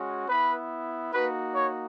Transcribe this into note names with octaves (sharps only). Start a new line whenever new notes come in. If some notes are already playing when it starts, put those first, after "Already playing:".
Already playing: G#3 C#4 F#4
B3 E4 B4
A#3 D#4 F#4 B4
C#5